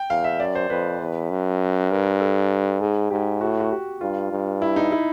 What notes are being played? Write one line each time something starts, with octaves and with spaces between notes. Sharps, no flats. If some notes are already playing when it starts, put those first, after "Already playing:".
Already playing: G5
E2 F5
E5
F#2 D5
C5
F2 B4
E2
F#2
G2 A#4
A4
G#2 G#4
G#2 G4
A2 F#4
F#4
G4
G2 F4
G2
E4
D#4
E4